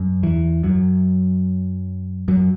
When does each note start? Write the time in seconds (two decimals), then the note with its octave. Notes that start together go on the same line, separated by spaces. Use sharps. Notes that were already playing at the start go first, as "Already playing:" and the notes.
Already playing: F#2
0.23 E2 E3
0.63 F#2 F#3
2.28 F#2 F#3